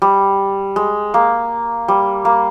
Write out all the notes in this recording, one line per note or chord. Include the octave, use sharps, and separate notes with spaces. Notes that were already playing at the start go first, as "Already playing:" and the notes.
G3
G#3
A#3
G3
A#3